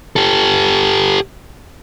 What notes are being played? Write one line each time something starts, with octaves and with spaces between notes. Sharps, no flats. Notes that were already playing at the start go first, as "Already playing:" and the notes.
G4 A4